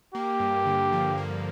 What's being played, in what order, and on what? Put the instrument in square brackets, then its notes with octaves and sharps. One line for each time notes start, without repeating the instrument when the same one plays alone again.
[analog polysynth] A#3 [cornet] G4
[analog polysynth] G2
D3
F3
A#3